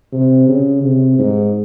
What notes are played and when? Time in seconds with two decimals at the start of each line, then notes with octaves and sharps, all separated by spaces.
0.12 C3
0.48 C#3
0.83 C3
1.19 G#2